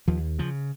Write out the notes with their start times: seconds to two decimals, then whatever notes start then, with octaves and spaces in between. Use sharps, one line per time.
0.08 D#2 F3
0.39 C#3 F3